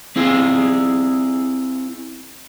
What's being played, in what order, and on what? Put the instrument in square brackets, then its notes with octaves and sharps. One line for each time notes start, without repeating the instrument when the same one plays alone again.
[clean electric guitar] C4 E4 G#4 F5